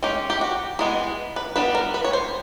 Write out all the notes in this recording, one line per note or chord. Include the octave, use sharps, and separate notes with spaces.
G#3 C#4 G4
G4
F#4
E3 G#3 B3 G#4
B4
G3 B3 D4 B4
A#4
B4
C#5
C5